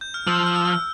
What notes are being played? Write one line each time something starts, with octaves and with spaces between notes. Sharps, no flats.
G6
F6
F3 E6
F6
E6
F6